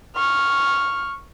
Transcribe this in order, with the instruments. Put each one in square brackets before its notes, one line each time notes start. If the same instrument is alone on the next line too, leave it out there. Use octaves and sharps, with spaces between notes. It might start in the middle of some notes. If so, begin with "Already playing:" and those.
[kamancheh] C#6 F6